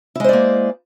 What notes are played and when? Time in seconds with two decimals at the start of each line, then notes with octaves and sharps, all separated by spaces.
0.15 E4
0.20 G#3
0.24 C5
0.29 D5
0.33 A#3